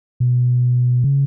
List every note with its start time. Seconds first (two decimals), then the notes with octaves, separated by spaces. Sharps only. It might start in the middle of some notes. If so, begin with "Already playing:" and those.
0.20 B2
1.04 C#3